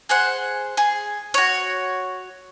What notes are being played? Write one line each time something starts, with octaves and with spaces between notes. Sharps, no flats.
G#4 C5 F#5
G#4
F#4 C#5